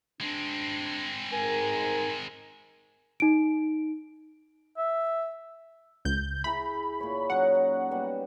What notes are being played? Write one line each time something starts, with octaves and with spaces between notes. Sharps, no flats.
G#3 C4 D4
G#2 A#4 G#5
D#4 D7
E5
C#2 G6
E4 G#4 A#5 B5
A#2 C#5
F#3 C#4 D#4 F#5
F#4 A#5
G3 B3